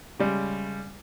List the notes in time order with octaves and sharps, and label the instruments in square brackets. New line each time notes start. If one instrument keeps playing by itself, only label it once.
[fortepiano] C#3 G3 G#3